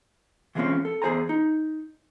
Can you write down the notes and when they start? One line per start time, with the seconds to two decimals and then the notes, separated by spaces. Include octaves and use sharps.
0.55 E3 F3 G#3 A#3 C4 C#4
0.85 A4
1.02 E2 G#4 C5 G#5 A#5
1.29 D#4